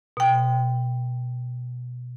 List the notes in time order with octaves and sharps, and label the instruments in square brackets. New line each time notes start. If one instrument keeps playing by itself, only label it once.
[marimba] B2 G5